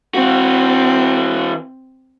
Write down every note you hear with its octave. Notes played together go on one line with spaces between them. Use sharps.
E3 C4 F#4